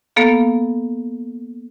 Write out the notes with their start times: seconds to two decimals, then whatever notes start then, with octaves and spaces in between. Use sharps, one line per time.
0.16 A#3 B3 A4 F5